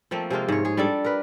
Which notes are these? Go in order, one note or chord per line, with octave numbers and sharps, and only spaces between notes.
F3 A3 A#3 C4
C3 G#3 A#3 F4
G#2 C#5
G#4
G3 D4 A4
A#4 B4